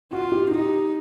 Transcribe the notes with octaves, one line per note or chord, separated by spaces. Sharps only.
F4 F#4
G4
D#4 G4